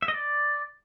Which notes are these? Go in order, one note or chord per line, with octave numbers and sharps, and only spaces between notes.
E5
D#5
D5